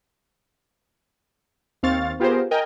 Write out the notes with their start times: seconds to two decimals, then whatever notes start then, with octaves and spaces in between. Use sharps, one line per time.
1.83 D#2 C4 F5 C#6 A6
2.20 B3 F4 G4 G#4 A#4 C5
2.51 A#4 D#5 G5 G#5